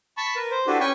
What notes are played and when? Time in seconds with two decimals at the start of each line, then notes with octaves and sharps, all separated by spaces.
0.17 A5 B5 C#6
0.36 A#4 B4
0.51 C5
0.67 D4 E4 F#4 G4 A4 B4
0.80 C#4 B4 G5 G#5 C#6